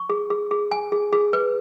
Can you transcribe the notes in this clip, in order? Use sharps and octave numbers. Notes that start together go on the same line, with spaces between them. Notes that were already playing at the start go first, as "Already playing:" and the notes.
Already playing: C#6
G#4
G#4
G#4
G#5
G#4
G#4
B4